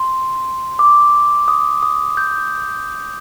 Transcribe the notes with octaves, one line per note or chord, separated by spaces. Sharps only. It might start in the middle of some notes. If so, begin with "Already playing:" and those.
Already playing: C6
D6
D#6
D#6
G6